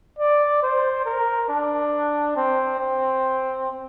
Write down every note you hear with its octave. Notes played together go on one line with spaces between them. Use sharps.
D5
C5
A#4
D4
C4
C4